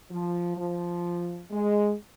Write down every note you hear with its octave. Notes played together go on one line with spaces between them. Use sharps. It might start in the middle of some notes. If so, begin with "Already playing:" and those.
F3
F3
G#3